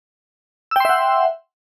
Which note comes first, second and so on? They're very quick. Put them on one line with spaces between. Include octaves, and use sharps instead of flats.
E6 G5 C6 E5 F#5